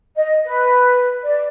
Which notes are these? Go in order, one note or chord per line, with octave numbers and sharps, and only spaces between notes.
D#5
B4
D5